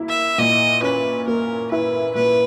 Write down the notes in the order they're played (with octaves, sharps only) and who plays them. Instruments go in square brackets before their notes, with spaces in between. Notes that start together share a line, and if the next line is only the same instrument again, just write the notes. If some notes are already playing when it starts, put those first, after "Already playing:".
Already playing: [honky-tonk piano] A#3 E4
[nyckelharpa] E5
[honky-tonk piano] A#2 [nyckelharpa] D#5
[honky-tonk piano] C#4 [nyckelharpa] B4
[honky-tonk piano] A#3 [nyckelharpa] A#4
[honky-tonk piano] E4 [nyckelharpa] B4
[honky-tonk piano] A#2 [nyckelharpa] B4